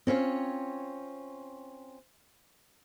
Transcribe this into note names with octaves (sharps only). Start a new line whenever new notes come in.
C4 C#4 F4 C#5